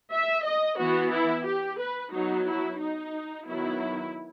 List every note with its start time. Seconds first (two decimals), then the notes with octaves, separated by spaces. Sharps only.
0.12 E5
0.45 D#5
0.78 E3 B3 F#4
1.12 E4
1.46 G4
1.79 B4
2.12 F#3 B3 D#4
2.47 E4
2.79 D#4
3.47 D#3 F#3 B3 E4